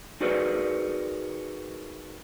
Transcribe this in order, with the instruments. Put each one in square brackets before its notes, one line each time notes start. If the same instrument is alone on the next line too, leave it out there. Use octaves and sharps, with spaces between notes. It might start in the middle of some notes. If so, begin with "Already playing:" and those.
[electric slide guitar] D#4 F#4 G#4 A#4 B4 D5